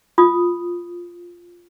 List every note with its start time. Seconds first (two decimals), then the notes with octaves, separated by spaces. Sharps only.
0.18 F4 D#6